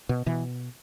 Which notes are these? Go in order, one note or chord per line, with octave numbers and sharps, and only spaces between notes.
B2
B2 E3